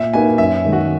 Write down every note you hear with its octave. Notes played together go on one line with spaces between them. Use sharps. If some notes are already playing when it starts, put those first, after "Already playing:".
Already playing: A#2 E5
A#3 D#4 F#4 B4 G#5
F#2 E5
D#3 G#3
F#4